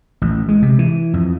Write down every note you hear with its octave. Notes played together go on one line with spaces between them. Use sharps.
A1
G#3
C3
E3
F2